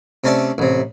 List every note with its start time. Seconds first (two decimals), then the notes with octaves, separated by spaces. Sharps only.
0.24 C3 A3 C#4 D5 A5
0.58 A1 C3